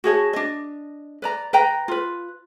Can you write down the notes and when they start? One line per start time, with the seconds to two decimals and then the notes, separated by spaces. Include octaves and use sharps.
0.04 F#4 G#4 C#5 A5
0.33 D4 D#5
1.22 B4 D5 A#5
1.53 B4 G5 A#5
1.88 F4 B4